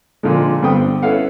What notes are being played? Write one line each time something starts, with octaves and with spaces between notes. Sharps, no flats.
A#2 D3 F3 G#3
G2 D3 B3 C4 G5 D#6
C#4 E4 A4 B4 F5 F#5